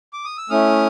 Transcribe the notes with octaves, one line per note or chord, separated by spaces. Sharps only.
D6
D#6
E6
A3 C#4 E4 D#6 F6